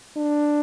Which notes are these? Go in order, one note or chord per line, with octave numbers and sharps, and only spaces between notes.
D4